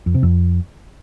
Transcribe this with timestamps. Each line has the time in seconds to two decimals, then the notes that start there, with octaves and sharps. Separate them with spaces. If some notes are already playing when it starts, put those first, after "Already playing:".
0.06 F2
0.14 C3
0.23 F2